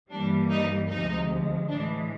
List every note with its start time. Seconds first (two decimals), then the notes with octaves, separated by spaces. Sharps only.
0.11 G2 E3 G3 A#3 D4
0.50 D#4
0.89 D2 C3 F3 G#3 D#4
1.68 A2 E3 G#3 D4